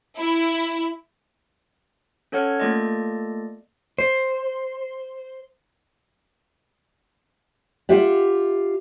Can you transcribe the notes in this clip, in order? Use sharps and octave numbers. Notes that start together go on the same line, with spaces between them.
E4
C#4 A4 C#5 F#5 F6 G#6
A3 A#3 F4 A4 D5 D#5
C5
F4 G4 E5 F#5